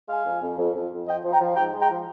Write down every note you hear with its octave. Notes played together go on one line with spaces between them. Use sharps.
G#3 F5 G#5
F2
F2
F2
F2
F2
F3 D#5 G5
F3
G5 A#5
F3
G#2 G5 A#5
G#3
G5 A#5
F3